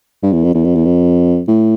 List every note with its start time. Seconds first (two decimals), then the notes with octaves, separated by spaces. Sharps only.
0.23 G2
0.33 E2
0.44 F2
0.54 E2
0.64 F2
0.75 E2
0.85 F2
1.48 A2